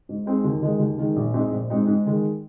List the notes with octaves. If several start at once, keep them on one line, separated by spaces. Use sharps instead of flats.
G#2
G#3 C4 D#4
D#2
D#3 G#3 D#4
D#2
D#3 G#3 D#4
A#1
G#2 G#3 C4 D#4
A#1
G#2 G#3 C4 D#4
G#2
D#3 G#3